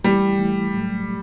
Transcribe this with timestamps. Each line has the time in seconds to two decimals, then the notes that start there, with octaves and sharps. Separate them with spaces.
0.04 E3 G3 A3 E4
0.38 E3 A3 E4
0.74 A2 F#3 A3